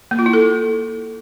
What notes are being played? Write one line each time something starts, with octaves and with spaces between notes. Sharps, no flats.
A#3
F4
E4
A4